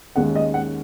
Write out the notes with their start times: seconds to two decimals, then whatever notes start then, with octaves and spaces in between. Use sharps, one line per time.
0.16 D#2 D#3 G#3 C#4 F#5
0.35 D#5
0.54 F#5